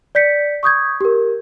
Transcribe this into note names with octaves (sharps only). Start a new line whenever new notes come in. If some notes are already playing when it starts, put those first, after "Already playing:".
D5 G6 B6 C#7
C#6 D#6 G6 G#6
G4 A#4